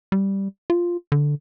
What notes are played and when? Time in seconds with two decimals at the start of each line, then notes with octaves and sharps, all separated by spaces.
0.12 G3
0.70 F4
1.12 D3